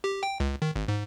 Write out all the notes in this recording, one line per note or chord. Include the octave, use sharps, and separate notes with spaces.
G4
G5
C#2
D#3
G#1
G#2